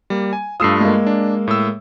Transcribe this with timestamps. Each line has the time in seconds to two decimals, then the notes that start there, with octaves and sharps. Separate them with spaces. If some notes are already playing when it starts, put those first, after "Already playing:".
0.10 G3 A#3
0.33 G#5
0.60 G2 A3 F4 D#6 E6 C7
0.81 G#3 A#3
1.07 D4
1.48 A2 E6